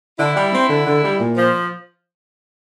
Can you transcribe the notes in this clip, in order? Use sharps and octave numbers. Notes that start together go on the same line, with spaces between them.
D3 E4
G3
C4
D3
D3
G3
A#2
F3